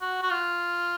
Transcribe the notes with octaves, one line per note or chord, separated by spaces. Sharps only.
F#4
F#4
F4